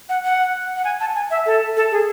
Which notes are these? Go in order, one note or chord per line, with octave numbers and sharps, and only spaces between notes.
F#5
F#5
F#5
G#5
A5
G#5
E5
A4
A4
G#4